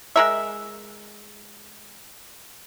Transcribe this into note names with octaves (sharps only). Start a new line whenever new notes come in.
G#3 A#4 E5